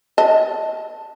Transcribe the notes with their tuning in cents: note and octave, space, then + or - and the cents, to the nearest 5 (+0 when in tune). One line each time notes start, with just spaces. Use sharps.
D#5 +25 A5 +0